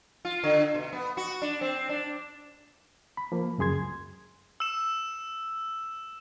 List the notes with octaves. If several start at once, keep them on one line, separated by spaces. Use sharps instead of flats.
F4
D3
B2
B3
F#4
D4
C4
D4
B5
F3 A#3
C#2 F#2 G#4 C6 G#6
E6 E7